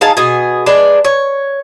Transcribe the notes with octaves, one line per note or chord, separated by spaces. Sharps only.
D#4 G#4 F5 A5
B2 G#4
G#3 D4 B4
C#5